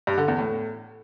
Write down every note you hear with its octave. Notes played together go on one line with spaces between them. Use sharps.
G2
D3
E2
A2